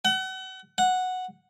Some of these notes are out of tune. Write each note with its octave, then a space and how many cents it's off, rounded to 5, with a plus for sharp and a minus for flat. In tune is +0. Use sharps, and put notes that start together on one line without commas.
F#5 +35
F#5 -5